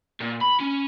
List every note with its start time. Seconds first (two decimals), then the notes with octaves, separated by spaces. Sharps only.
0.20 A#2
0.41 B5
0.60 C#4